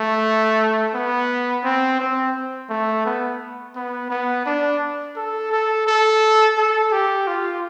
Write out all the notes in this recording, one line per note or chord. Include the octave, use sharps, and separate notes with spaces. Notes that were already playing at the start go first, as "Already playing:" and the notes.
Already playing: A3
B3
C4
C4
A3
B3
B3
B3
D4
A4
A4
A4
A4
G4
F4